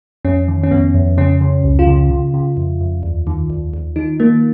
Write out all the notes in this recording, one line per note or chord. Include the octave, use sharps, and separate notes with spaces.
F2 C#4
D#3
C#4
F2 B3
F2
C#3 C#4
C#3
C#2
F4
C#3
C#3
C#3
F2
F2
D#2
D#3
D#2
D#2
D#3 D#4
D#3 A#3